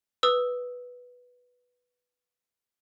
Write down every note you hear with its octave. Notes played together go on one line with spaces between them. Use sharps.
B4 D#6 E6